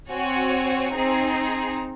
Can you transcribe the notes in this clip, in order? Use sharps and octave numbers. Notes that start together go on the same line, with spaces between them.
C4 F#4 C#5 G#5
C4 D#4 G#4